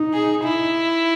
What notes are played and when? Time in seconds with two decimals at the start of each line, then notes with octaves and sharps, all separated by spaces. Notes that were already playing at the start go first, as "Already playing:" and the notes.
Already playing: D#4
0.14 G#4
0.44 E4